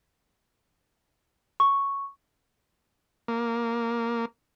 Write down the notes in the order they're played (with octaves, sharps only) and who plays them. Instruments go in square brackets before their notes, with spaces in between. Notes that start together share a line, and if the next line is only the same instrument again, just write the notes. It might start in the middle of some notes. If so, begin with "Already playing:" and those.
[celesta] C#6
[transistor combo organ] A#3